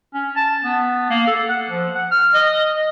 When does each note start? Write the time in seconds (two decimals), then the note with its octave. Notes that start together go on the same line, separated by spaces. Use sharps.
0.14 C#4
0.36 A5
0.64 B3
1.10 A#3
1.27 A4
1.49 F#5
1.69 F3
1.95 F#5
2.11 F6
2.34 D#5